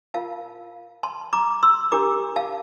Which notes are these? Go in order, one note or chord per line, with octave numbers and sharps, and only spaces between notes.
F4 A#4 F5 A5
A5 C6
A#5 D6
C6 E6
D4 G4 A#4 A#5 D6
F5 A5